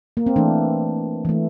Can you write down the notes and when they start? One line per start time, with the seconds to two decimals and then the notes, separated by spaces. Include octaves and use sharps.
0.17 A#3
0.26 C4
0.36 E3 A3 D4
1.25 E3 A3